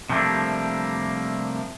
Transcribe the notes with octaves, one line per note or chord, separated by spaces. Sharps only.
C3 F3 G3 A3 A#3 D4